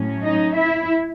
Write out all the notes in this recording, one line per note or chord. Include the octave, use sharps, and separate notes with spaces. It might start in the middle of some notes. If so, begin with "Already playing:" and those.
Already playing: A2 F#3 C#4
D#4 D#5
E4 E5